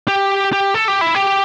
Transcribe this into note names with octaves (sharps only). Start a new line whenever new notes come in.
G4
G4
A4
G4
E4
G4